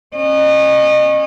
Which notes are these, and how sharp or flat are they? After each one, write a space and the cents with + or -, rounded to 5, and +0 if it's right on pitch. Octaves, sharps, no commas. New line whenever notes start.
C#4 -25 D#5 -30